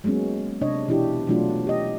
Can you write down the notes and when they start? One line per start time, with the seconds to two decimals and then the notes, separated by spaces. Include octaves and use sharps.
0.04 F#3 G#3 A#3 B3 C#4
0.61 C3 D4 C#5 D#5
0.88 B2 E3 D4 E4 G4
1.27 B2 E3 F#3 A3 D4 F4
1.67 G4 D#5